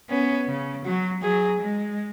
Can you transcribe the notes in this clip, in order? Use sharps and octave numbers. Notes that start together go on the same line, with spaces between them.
B3 C#4
C#3
F#3 F#4
F#3 G#4
G#3